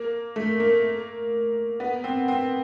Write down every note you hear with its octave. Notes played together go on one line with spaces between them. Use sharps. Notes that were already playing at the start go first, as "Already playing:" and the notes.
Already playing: A#3
A3
A#3
B3
C4
C4